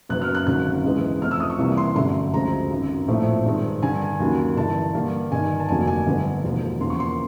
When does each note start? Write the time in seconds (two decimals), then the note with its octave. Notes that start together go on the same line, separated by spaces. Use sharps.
0.09 F#1 F#2 C#3 F#3 B3 F#6
0.22 F6
0.35 F#6
0.47 G#1 F#2 D3 F#3 F#6
0.84 C#2 C3 E3 G#3 B3
1.22 F2 C3 F3 A3 F6
1.31 E6
1.40 D#6
1.50 C#6
1.58 C2 C3 E3 G3 A#3
1.77 C6
1.96 G1 F#2 D3 F#3 A3 C6
2.34 D2 C#3 F3 G#3 C4 A#5
2.70 G#1 F#2 C#3
3.08 A#1 A2 F3 A3 C4
3.45 G2 D#3 G#3 C4
3.82 G2 D3 G3 G#5
4.02 G#5
4.20 D#2 C#3 F#3
4.56 G1 G2 E3 A5
4.94 G2 D3 G3 A#3
5.32 G1 G2 D#3 G#5
5.60 A5
5.69 F1 F2 D3 F#3 A#3 G#5
5.87 G#5
6.06 G1 F2 D3 G3 B3
6.44 E1 D#2 D3 F3
6.81 E2 C#3 F3 A#3 C6
6.90 C#6
7.00 C6